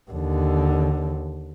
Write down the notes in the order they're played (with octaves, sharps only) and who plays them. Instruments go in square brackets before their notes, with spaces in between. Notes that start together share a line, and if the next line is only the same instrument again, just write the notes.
[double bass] D#2 D3